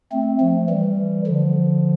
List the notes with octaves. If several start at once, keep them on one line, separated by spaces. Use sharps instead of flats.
A3 C4
F3 A3
E3 G3
D3 F3